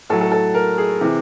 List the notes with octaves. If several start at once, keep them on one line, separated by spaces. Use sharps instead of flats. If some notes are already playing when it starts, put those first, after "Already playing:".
A2 F#3 A4
A4
A4
A#4
G#4
C3 E3